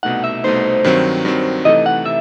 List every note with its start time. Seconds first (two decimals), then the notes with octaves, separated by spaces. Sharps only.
0.03 C2 B2 A3 D#4 F#5
0.24 E5
0.44 C2 B2 A3 D#4 C5
0.84 G2 D#3 F#3 C4
1.25 G2 D#3 F#3 C4
1.65 C3 E3 A3 D#4 A4 D#5
1.86 F#5
2.05 C3 E5